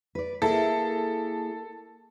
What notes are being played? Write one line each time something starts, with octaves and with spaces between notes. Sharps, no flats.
B4 D5
A#3 E4 G#4 A4